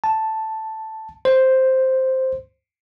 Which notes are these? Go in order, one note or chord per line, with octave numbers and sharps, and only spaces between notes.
A5
C5